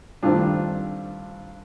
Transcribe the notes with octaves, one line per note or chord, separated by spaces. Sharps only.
G2 D#3 A3 C4 D4 F4